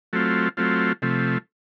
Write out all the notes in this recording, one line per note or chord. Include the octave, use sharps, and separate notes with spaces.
F#3 A3 C4 F4
F#3 A3 C4 F4
C3 F3 A3